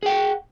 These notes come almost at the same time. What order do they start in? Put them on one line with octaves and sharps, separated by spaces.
G#4 G5 F#5